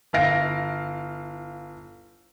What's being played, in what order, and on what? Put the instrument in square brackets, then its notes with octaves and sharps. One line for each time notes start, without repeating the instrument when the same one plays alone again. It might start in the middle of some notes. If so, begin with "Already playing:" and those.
[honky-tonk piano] G1 E4 F5 A#6 D7